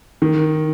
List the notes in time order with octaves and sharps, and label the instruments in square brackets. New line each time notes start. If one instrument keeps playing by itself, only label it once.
[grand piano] D#3